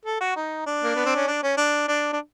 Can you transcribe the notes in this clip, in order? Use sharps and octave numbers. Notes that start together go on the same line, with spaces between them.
A4
F#4
D#4
D4
A#3
B3
C4
C#4
D4
C#4
D4
D4
D4